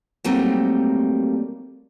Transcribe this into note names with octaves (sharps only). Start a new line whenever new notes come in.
F#3 G3 A3 A#3 C4 D#4